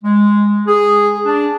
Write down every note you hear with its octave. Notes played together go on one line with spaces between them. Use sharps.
G#3
G#4
D4